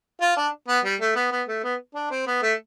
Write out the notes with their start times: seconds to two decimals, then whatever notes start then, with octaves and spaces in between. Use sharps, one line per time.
0.21 F4
0.37 D4
0.68 B3
0.84 G3
1.01 A3
1.16 B3
1.32 B3
1.48 A3
1.64 B3
1.95 D4
2.11 C4
2.27 B3
2.42 A3